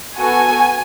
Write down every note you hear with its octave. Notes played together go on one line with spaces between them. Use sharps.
B3 F#4 A4 G#5